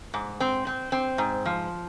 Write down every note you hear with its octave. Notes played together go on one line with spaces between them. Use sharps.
G#2
C4
C4
C4
G#2
F3